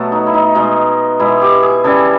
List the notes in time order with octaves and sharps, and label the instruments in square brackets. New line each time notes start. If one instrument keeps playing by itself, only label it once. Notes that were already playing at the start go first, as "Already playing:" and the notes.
Already playing: [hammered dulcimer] B2 F#3 A3 A4
D#4
E4
D#4
B2 G#3 D#4
B2 G#3 E4
G4
G#4
C#3 E3 G3 A4